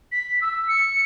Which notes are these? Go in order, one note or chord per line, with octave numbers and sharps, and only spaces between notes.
B6
E6
C#7